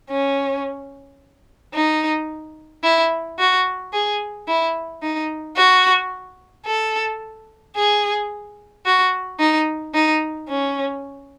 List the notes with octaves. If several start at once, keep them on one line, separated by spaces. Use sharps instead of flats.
C#4
D#4
E4
F#4
G#4
E4
D#4
F#4
A4
G#4
F#4
D#4
D#4
C#4